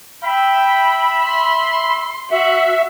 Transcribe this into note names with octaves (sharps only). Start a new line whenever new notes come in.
E5 G5 B5
C6
F#4 E5